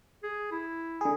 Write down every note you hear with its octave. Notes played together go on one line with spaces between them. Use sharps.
G#4
E4
D3 G#4